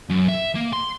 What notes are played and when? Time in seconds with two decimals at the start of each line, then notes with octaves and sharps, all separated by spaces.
0.09 F#2
0.28 E5
0.56 A#3
0.73 C6